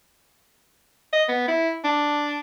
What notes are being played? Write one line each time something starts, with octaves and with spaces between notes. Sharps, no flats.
D#5
B3
E4
D4